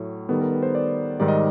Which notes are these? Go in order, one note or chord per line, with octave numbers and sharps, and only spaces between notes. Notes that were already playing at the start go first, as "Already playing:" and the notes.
Already playing: A2 F#3 A3 C#5
D#3 G3 B3 A4
A#4
B4
C5
D5
G#2 D#3 G3 D5
D#5